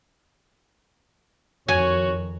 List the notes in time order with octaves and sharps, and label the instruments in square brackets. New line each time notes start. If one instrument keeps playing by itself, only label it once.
[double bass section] F2 D#3 [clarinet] F#4 [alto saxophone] C#5 [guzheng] G#5